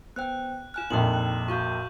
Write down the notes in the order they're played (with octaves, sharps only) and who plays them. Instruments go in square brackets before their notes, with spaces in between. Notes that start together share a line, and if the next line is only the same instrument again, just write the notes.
[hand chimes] B3 C5 G5 [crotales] F#6
[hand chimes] F4 G#5 F6 [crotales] F#6 E7
[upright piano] A#1 F2 A#2 [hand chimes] D#4 G5 [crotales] F#7
[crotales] F#6
[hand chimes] F4 F#4 F5 [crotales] C#6 G6